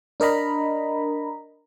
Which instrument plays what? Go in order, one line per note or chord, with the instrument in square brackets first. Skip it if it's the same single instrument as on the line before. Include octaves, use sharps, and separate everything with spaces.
[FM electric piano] D4 A#4 D#5 A#5 B5